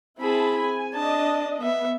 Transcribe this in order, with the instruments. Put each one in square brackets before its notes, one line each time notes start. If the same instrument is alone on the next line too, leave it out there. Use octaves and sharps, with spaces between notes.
[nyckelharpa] C4 G#4 [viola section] E4 A5 B5
[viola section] G#5
[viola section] D4 D#5 [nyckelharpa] A5
[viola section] B3 [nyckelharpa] E5